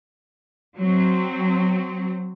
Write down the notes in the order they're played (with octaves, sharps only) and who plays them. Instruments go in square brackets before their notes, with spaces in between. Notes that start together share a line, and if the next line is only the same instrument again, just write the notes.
[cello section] F#3 C4